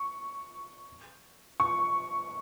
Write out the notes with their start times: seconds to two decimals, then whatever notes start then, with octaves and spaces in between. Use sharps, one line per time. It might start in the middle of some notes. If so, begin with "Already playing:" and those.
Already playing: C#6
1.60 C#6